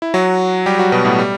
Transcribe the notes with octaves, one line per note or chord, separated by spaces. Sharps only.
E4
F#3 F#4
G3 G4
F#3 F#4
B2 B3
A2 A3
G3